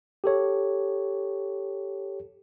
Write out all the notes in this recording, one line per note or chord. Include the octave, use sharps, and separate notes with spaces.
G4 A4 C#5